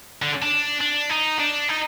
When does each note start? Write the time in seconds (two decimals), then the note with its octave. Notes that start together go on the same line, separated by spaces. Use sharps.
0.22 D3
0.42 D4
0.81 D4
1.10 D#4
1.40 D4
1.69 D#4